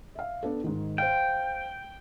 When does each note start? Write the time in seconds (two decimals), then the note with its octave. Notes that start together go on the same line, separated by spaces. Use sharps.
0.15 E5 F5
0.43 B3 D4 A4
0.64 G#2 D#3
0.98 C5 F5 G5